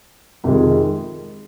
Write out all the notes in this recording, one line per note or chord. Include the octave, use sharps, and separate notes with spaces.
F2 C3 D#3 G#3